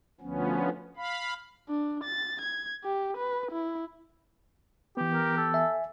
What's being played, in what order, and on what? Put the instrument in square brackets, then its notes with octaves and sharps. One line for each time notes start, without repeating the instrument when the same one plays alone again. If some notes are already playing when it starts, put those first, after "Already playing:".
[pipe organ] D2 F3 B3 C#4
F5 B5
[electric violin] D4
A6
G#6
G4
B4
E4
[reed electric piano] E3 B3 [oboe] G4
[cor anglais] A#4
A4
[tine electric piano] E5 G#5